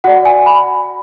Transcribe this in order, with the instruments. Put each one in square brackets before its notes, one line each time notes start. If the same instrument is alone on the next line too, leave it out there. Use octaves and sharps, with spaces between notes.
[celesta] F#4 D5 F#5
G#5
B5